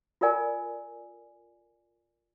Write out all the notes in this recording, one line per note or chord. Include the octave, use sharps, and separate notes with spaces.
F4 A4 A#4 D5 G#5